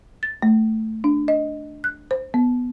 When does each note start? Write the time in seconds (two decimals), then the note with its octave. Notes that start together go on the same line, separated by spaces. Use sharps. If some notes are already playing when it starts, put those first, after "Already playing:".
0.23 A6
0.42 A3
1.04 D4
1.28 D#5
1.84 F#6
2.11 C5
2.34 B3